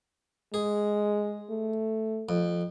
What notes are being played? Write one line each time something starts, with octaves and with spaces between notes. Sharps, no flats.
G#3 G#4
A3
F2